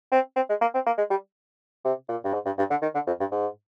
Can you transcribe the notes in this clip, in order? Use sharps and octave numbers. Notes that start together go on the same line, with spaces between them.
C4
C4
G#3
A#3
C4
A#3
G#3
G3
C3
A#2
G2
G#2
G2
G2
D3
D#3
D3
F2
G2
G#2